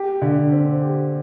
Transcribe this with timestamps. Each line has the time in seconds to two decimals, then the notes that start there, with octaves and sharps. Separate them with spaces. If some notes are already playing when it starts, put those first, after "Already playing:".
Already playing: G4
0.22 D3
0.52 C4
0.82 G4